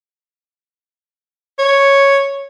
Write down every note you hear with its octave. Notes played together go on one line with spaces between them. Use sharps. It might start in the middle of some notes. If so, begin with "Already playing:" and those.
C#5